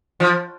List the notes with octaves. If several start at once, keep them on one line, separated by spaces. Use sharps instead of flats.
F3